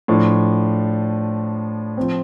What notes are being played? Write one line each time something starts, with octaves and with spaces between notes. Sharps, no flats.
A2 F3 D4
F3 C4